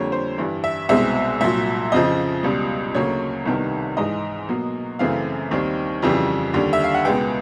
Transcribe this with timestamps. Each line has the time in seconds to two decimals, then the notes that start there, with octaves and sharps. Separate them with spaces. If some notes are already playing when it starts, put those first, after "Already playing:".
Already playing: F2 D3 G3 A#3 C#5
0.12 C5
0.38 G2 E3 G3
0.64 E5
0.89 C2 B2 G#3 C4 E5
1.41 C2 A#2 F#3 E5
1.92 F2 C#3 F3 D#5
2.43 C#2 B2 G3
2.95 D2 C#3 F#3 A#3 C#5
3.46 C2 C3 D#3 G3 B3
3.97 G#2 E3 G#3 D#5
4.48 B2 F#3 A#3
4.99 F#2 C#3 E3 A3 C4 F5
5.51 D#2 D#3 G3 C4
6.02 F2 C#3 E3 G3
6.54 D#2 D3 G3
6.73 E5
6.84 F5
6.94 F#5
7.05 C#2 B2 G#3 B3 G5